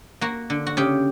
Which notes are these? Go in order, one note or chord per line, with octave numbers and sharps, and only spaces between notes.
A#3 F#4
D3
F#4
C#3 G4